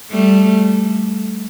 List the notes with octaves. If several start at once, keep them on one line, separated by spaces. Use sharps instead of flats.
G3 A3